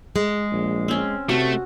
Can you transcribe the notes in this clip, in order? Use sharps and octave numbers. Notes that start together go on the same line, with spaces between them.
G#3
A#1
C4 C#4
C3 A3 F#4